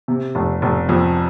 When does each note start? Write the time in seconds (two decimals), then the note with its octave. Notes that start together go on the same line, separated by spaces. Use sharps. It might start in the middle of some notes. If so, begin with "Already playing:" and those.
0.08 C3
0.35 F1
0.62 F1
0.89 F2